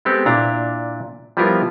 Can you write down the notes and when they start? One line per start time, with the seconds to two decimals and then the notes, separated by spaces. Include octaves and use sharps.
0.05 G#3 B3 C4 G4 A4
0.26 A#2 D4 E4 A#5
1.37 F3 G3 B3 E4 F4 A#4